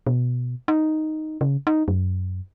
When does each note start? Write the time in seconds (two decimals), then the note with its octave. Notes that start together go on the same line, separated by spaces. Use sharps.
0.07 B2
0.68 D#4
1.41 C#3
1.67 D#4
1.88 F#2